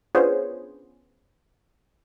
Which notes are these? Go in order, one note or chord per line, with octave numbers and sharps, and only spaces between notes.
B3 C#4 D4 F4 G#4 C5